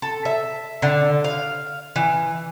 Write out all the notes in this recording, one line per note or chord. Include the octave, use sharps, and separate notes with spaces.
A4
E5
D3
F5
E3